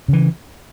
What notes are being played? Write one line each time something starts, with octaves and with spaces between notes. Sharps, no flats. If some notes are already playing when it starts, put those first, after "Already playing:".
C#3 E3